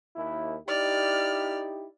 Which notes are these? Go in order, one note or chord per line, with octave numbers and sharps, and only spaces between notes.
D#2 E4
D#4 E4 G4 D5 F6